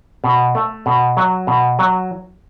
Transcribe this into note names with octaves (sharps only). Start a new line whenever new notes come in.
B2
A3
B2
F#3
B2
F#3